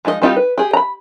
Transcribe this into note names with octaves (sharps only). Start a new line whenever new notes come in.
F3 G#3 D#4 F#4 D#5
G3 C4 D#4 F4 G4
B4
G4 G#4
A#5 B5